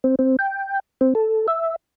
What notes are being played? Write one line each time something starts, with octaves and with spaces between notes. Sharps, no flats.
C4
C4
G5
C4
A4
E5